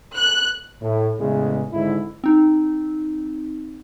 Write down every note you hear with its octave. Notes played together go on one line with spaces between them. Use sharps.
F#6
A2
E2 A2 C#3 E3 G#3
G#1 G#2 D3 E4
C4 D#4